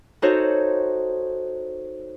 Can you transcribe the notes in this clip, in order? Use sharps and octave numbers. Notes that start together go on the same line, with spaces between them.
D#4 F#4 A4 C5 C#5